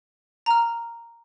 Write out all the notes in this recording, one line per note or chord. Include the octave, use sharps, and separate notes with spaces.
A#5 F6